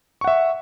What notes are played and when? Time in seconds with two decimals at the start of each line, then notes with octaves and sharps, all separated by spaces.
0.21 C#6
0.24 F#5
0.27 E5